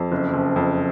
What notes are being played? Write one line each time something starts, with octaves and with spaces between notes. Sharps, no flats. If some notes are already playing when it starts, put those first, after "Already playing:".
Already playing: F2
F#1
F#1
F2